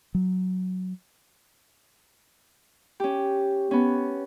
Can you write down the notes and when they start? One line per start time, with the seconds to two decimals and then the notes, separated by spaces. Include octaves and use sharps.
0.14 F#3
3.00 C#4 G4
3.71 B3 C#4